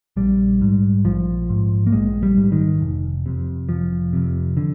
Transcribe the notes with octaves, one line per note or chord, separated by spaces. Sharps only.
A#1 G3
G#2
A#1 F3
G#2
A#3
A#1 G#3
G3
G#2
D#3
F1
F2 C3
F1 F3
F2 C3
D3